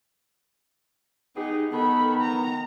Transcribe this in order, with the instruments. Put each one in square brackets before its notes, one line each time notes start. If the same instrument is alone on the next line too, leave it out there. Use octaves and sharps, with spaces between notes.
[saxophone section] B3 G4 G#4 [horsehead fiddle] D#4
[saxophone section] D#3 B3 [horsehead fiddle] A4 B5
[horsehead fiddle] A#5